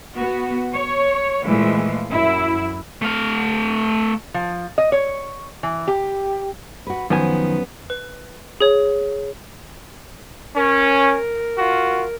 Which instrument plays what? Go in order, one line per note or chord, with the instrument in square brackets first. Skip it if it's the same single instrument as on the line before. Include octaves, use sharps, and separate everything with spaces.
[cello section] B3 F#4
C#5
A#2 E3 F3 G#3 A3
F#2 E4
[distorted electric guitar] A3 F5
[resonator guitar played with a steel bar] F3
D#5
C#5
E3
G4
[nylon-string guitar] F#4 B4
[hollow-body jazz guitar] F#2 B3 G#5 [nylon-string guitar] D#3 F3
[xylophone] B4
G#4 C#5
[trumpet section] C#4 [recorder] A#4
[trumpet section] F4 F#4